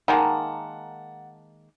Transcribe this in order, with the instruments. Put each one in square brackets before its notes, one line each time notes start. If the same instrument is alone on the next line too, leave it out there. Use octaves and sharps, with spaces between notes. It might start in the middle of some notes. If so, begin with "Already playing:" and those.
[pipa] D#3 G#3 A#3 [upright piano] F#5 A5